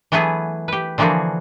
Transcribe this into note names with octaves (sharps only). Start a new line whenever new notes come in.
E3 F#3 A3 B3 G#4
G4 B4
D3 E3 F3 A#3 F#4 G#4